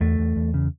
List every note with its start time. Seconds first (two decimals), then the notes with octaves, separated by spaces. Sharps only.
0.01 E2 A3
0.19 E2
0.36 E2
0.54 C#3